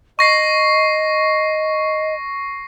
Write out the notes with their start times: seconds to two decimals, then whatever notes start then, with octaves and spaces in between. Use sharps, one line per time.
0.19 D#5 C#6 A#6 C7